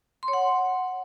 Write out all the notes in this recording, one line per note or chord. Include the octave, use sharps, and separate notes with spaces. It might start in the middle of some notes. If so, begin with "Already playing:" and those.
C6
C#5
F#5